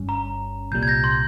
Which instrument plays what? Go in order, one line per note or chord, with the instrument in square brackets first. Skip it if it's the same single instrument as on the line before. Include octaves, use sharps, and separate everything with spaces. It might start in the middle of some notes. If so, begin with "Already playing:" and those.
Already playing: [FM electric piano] G1 G2 G3 C#4
[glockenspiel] A#5
[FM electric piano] C2 A#2 G3 [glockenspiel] G6
[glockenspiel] G#6
G6 A#6
C6